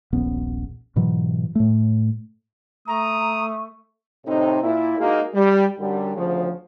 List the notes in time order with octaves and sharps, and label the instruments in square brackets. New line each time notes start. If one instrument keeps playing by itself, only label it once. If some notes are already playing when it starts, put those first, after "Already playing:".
[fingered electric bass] D#1 A#1 B3 C#4
G#2 B2 E3 F#3
A2 A3
[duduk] A3 [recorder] A#5 [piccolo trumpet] D#6
[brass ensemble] A2 C3 C4 D#4
A#2 E4
G#3 A#3 D#4 F#4
G3
F#2 D3 G3
D2 C#3 F3